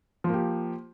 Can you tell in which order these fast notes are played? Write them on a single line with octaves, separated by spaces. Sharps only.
F3 A#3 G4